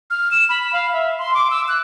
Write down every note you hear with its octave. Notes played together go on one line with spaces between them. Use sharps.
F6
E7
B5
F5
E5
C6
D6
E6
F#6